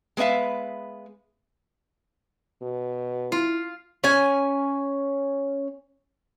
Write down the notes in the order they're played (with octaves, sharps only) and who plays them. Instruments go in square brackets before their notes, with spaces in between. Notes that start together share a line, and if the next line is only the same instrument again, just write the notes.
[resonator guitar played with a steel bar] G#3 B3 B4 E5 F5
[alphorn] B2
[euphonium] E4 [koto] F4
[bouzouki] C#4 G#5